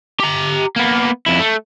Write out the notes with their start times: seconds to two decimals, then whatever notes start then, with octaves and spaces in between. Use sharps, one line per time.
0.20 G4 A#5
0.76 A#3 B3
1.26 F2 E4
1.40 A3